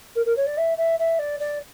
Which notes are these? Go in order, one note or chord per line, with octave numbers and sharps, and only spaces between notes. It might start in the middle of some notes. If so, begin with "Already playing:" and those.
A#4
A#4
C#5
D5
E5
E5
E5
D5
D5